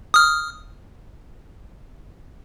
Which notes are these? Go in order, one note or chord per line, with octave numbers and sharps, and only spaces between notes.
D#6 F6